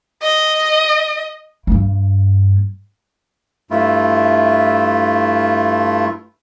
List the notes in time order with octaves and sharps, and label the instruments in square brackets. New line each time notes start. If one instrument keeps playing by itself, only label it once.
[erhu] D#5
[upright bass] G2 A#3
[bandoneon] G2 A3 E4 F4